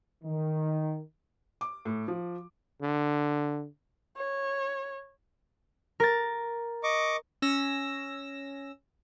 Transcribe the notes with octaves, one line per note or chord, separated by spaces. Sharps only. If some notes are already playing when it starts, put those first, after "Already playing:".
D#3
D6
A2
F3
D3
C#5
A#4 A6
D#5 C#6 D6
C#4 E6 A#6